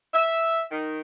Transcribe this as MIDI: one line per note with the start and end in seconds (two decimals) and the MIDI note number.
0.14 0.63 76
0.71 1.00 51